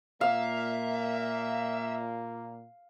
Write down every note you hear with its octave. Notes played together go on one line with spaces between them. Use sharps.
A#2 A#3 E5 F5